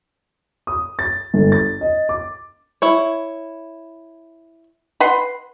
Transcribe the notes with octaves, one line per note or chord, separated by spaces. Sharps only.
D#6
A6
G1
A6
D#5
D6
E4 C#5
B4 F#5 C6